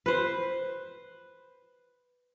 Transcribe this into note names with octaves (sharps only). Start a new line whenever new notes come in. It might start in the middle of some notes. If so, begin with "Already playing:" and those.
B4 C5